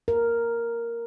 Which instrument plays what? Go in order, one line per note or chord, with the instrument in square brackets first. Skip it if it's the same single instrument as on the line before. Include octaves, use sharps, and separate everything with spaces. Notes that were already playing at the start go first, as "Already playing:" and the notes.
[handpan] A#4